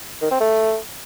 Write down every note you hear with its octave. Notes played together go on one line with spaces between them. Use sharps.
D#3
C4
A3